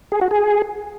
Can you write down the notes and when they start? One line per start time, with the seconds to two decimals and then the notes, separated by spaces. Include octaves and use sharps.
0.12 G#4
0.21 F#4
0.31 G#4